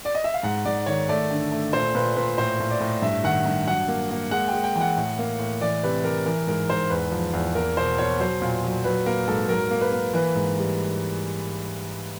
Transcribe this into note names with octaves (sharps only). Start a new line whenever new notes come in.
D5
D#5
E5
F5
G#2 F#5
G#2 D5
D#3 C#5
A3 D5
D3
A3
A#2 C5
A#2 B4
A#2 B4
A2 C5
A2
D5
A2
G2 E5
D#3 F#5
G2
F#3 F#5
A#3
A#3
G#3 F#5
G#3 G5
G5
E3 G5
F#5
A2
A#3
A2
E3 D5
C3 B4
E3 A#4
E3 A#4
G#2 A#4
G#2 C5
E2 B4
F3
E2
A#3 A#4
B2 C5
B2 C#5
F#3 C5
A#2
F#3
F#3 B4
A#3 A#4
G#2 A4
F#3 A#4
A#3
B4
A#3
E3 B4
G#2
G3